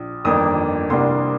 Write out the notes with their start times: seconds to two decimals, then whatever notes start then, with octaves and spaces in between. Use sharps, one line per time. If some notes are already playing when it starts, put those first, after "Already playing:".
Already playing: A#1
0.24 G1 F2 D#3 A#3 D4 D#6
0.90 C2 C3 G3 A#3 D4 C6